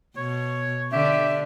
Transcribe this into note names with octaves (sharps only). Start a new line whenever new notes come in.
B2 C#5
D3 G4 E5